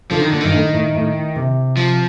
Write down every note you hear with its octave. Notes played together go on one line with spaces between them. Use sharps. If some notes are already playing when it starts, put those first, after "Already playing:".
D3 F3
D#3
A#2 D3
G2 D#3
A2
A2
A2
C3
F3